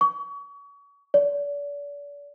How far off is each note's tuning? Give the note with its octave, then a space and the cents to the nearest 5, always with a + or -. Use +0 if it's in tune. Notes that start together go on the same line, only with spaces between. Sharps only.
C#6 +35
D5 -40